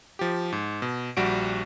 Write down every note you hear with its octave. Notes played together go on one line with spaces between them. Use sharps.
F3 G4
G#2
B2
A#1 G3 F#4 D7